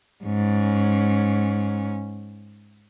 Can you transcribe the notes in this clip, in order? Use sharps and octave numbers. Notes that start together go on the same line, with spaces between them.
G#2 C#4